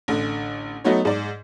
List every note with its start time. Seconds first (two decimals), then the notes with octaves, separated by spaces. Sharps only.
0.08 A1 D3
0.84 F#3 A3 B3 D#4 F#4 C#5
1.05 G#2 D5